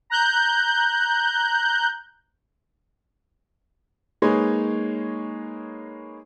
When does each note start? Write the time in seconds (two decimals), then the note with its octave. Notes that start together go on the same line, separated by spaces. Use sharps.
0.10 A#5 F#6 G6
4.22 G#3 A#3 D#4 G#4 B4 C#5